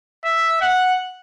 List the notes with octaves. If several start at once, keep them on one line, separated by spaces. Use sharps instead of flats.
E5
F#5